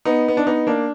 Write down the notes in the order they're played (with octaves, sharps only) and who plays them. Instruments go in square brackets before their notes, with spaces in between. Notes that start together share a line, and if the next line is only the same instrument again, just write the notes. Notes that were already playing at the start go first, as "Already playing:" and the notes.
[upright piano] B3 D#4
B3
D4
B3 D#4
A#3 D4